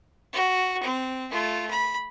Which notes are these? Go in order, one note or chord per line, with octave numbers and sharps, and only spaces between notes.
F#4
C4
A3 F4
B5